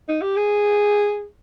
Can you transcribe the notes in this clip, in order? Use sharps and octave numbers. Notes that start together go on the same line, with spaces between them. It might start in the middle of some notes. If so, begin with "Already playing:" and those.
D#4
G4
G#4